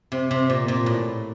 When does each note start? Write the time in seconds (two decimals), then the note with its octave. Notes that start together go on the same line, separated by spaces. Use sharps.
0.12 C3
0.31 C3
0.50 A#2
0.68 A#2
0.86 A2